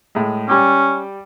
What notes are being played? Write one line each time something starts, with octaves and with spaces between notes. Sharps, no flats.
A2 G#3
G3 C#4 G5 D6